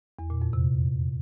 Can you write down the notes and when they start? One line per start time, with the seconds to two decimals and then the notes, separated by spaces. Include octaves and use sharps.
0.19 E2
0.30 A#2
0.42 F2
0.53 C3